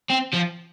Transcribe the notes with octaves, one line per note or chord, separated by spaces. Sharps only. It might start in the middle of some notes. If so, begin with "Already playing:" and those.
C4
F3